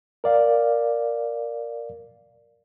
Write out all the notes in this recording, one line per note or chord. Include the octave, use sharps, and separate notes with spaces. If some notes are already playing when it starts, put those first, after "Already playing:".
A#4 D5 F5